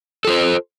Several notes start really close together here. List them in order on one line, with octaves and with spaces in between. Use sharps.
A4 F4 C5